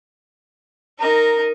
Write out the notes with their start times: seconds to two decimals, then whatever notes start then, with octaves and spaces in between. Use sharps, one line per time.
0.99 D#4 A#4